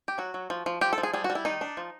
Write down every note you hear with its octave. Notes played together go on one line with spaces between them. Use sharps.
G4
F#3 F#4
F#3
F3
F3
F3 G4
A4
F3
G#4
G3 G#4
F#4
G3
E4
D#3 D#4
D4
F3